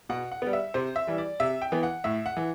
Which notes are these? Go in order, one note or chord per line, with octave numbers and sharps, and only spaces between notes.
B2 F#5
F#5
G3 B3
E5
C3 C5
E5
E3 G3
D5
C3 E5
G5
E3 B3
F#5
A2 E5
F#5
E3